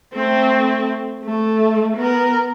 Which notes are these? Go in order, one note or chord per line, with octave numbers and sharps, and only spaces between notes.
A3 C4
A3
B3 A#4